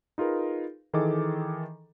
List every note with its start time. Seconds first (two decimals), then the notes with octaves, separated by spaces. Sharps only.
0.18 D#4 F4 G#4 A#4 B4
0.94 D#3 E3 G#4 A4 D#5 D6